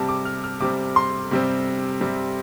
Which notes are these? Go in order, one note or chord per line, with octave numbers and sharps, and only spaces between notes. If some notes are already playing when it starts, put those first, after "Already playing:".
Already playing: C3 G3 C4 A5
D6
F6
F6
C3 G3 C4 D6
C6
C3 G3 C4
C3 G3 C4